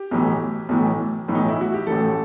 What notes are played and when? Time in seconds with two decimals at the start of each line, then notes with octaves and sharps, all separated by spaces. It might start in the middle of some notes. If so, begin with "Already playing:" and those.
Already playing: G4
0.11 B1 A2 E3
0.69 B1 A2 E3
1.28 B1 A2 E3
1.35 D#4
1.48 E4
1.61 F#4
1.74 G4
1.87 A1 A2 E3 A4